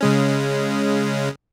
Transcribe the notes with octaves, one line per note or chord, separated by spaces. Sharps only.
C#3 G#3 C#4